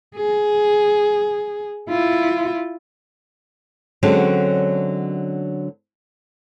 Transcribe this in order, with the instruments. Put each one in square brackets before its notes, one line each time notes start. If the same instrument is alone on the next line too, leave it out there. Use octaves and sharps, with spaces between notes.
[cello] G#4
E4 F4
[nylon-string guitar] D3 F#3 G#3 C4 C#4